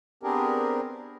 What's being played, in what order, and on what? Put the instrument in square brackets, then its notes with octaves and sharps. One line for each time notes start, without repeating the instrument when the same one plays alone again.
[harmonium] B3 C4 D4 G4 G#4 A#4